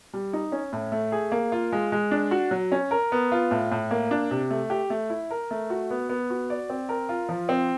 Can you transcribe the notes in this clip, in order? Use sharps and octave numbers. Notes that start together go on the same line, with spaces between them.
G3
D#4
C#4
A2
A3
G#4
A#3
F4
G#3
G#3
D4
F#4
F#3
C#4
A#4
B3
F4
A2
A2
A#3
D4
C3
A3
G4
A3
E4
A#4
A3
F#4
B3
B3
F#4
D5
C4
A#4
F4
F3
C4